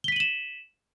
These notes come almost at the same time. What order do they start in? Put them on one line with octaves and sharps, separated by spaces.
G7 B6 D#7 F#7 E7